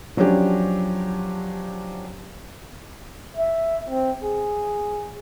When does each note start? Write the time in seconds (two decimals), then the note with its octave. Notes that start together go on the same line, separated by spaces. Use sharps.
0.17 F3 F#3 C#4 D4 G4
3.36 E5
3.89 C4
4.24 G#4